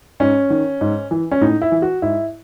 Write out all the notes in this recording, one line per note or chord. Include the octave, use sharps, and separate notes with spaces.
G#2 C#4
D#3
G#2
E3
C#4
A2 D#4
E4
E3
F#4
G#2 E4